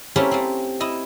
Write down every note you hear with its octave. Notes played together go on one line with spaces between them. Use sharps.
A3 A#3 C4 C#4 E4 G4
A3 C4
E4 D#5